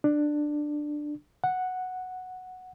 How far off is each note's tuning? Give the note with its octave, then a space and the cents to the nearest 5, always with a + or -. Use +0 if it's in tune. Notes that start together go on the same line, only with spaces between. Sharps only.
D4 +15
F#5 -5